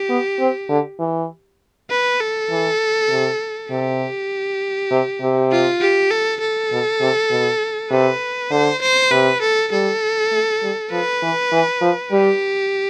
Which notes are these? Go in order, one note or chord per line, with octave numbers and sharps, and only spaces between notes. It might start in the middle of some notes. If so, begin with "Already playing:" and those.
Already playing: G4
B3
C4
D3
E3
B4
A4
E3
C3
C3 G4
C3
C3
F4
G4
A4
A4
B2
C3
B2
C3 B4
D3 C5
C5
C3 B4
A4
G3 A4
A3
G3
F3 B4
E3
E3
F3
G3 G4